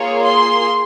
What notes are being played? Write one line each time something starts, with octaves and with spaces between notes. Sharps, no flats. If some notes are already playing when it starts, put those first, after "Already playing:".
Already playing: A#3 F4 G#4 C#5
C6